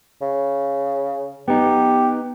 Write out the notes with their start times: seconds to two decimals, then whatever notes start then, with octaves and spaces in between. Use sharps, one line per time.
0.21 C#3
1.48 B3 D#4 G4